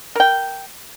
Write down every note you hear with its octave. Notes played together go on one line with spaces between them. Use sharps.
A#4 G5